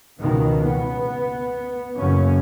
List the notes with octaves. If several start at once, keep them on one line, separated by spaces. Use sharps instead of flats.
C#2 B2 D#3
B3
F#1 F#2 C#3 C#4